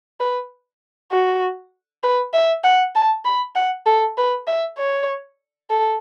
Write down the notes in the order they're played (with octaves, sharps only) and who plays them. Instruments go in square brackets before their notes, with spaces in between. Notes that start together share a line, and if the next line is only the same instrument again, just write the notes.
[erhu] B4
F#4
B4
E5
F#5
A5
B5
F#5
A4
B4
E5
C#5
A4